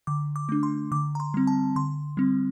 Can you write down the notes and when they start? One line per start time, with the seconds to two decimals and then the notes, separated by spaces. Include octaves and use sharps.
0.07 D3 D6
0.36 D6
0.49 A3 D4
0.63 C6
0.92 D3 D6
1.15 A#5
1.20 C6
1.34 G3 C4
1.47 A5
1.76 D3 C6
2.17 G3 C4